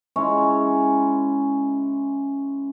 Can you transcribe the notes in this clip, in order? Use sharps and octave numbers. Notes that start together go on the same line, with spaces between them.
G#3 C#4 E4 C#5